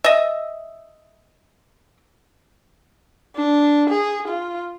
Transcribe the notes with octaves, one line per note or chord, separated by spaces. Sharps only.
D#5 E5
D4
G#4
F4